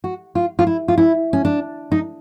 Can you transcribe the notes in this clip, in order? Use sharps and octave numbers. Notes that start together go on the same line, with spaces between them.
F#4
F4
F4
E4
F4
E4
C#4
D4
D#4